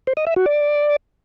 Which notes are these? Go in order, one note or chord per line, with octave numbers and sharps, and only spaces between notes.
C5
D#5
E5
F#4
D5